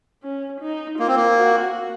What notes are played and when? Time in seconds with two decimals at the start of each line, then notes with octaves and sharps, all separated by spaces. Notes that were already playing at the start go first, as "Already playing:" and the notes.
0.23 C#4
0.61 D#4
0.99 A#3 F4
1.07 C4
1.15 A#3
1.37 F#4